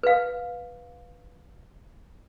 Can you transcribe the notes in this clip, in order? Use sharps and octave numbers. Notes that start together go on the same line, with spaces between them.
B4 F5